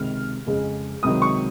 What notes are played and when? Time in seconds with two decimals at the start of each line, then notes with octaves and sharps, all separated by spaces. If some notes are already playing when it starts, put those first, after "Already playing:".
Already playing: C#2 C3 D#3 F6
0.46 F2 C#3 G#3
1.03 C#2 C3 D#3 F#3 D#6
1.22 C#6